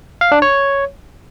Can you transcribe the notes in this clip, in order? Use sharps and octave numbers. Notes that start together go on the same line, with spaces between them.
F5
D4
C#5